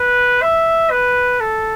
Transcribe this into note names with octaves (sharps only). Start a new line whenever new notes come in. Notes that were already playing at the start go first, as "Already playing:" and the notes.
Already playing: B4
E5
B4
A4